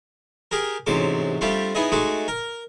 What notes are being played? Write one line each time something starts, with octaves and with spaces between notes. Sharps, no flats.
G4 G#4 A#4
A1 G#2 C3 F#3 D6
G3 A3 C4 D4 F4 G4
B3 D#4 E4 G#4 D#5
G#3 A3 D#4 F#4 G#4
A#4